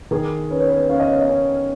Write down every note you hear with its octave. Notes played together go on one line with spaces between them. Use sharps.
D#3 G#4
C#4 B4
C#5
B4
C#4 F5
D#5
C#5
D#5
C#4